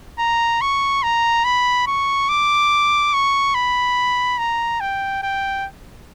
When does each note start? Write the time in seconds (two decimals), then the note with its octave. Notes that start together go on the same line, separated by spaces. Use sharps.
0.19 A#5
0.61 C#6
1.03 A#5
1.45 B5
1.87 C#6
2.29 D6
3.13 C#6
3.55 B5
4.39 A#5
4.81 G5
5.23 G5